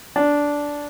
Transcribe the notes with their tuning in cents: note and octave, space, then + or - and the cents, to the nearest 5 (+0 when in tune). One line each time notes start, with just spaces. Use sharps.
D4 -10